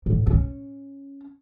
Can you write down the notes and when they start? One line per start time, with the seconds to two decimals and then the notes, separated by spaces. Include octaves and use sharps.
0.06 A2
0.27 C#4